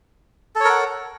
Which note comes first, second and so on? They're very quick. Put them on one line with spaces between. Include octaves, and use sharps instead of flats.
A4 C#5 A#4 F#5